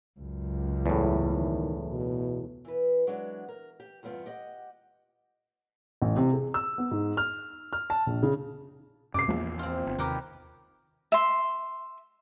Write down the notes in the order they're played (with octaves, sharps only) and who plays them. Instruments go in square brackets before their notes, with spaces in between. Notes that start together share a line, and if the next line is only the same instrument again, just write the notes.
[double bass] C#2 F#2
[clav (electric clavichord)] E2 A2
[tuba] D#3
B2
[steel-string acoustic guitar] E3 B4
F#3 G#3 B3 D4
A#4
G4
E2 G2 B3 C4 F4
G4 D#5 F#5
[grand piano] A1
C3
G#4
E6
B3
G#2
F6
F6
A5
A#1
C#3
[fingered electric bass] F#2 C3 [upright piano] D6 C7
[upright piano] A#1 [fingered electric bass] E2 F#3 A#3
[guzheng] C4 F4
[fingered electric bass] G1
[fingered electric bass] D#2 C3 [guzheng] G4 A#4 B4
[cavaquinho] E5 C6